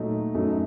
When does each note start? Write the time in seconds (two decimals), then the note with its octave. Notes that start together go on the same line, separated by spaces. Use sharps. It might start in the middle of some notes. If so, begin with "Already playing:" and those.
Already playing: A#2 F#3 A3 D#4
0.34 F#2 F#3 A3 D#4